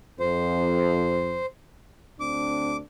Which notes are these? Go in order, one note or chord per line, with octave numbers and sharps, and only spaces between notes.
F2 C5
D2 C4 D4 D6